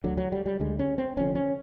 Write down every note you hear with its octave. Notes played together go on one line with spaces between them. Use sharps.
D2 D3 F#3
F#3
G3
G3
D2 D3 G#3
C#4
C4
F1 F2 D3 C#4
C#4